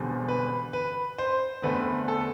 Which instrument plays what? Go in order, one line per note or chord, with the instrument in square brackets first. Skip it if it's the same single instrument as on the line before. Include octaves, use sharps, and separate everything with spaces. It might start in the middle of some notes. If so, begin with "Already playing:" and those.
Already playing: [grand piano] E1 E2 D3 G3 C4
B4
B4
C5
E2 D3 A3 C4 B4
A4